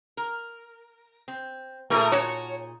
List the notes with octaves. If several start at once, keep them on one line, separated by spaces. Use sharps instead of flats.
A#4
C4
A#2 A3 D#4 G#4 A#4
F#4 C#5